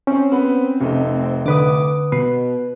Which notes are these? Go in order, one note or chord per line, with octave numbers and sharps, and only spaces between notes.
C4 C#4
B3 B5
F1 A3 D#4
D3 B4 D6 D#6
B2 B4 C7